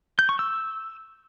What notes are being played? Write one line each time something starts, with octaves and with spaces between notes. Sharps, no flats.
G6
C#6
E6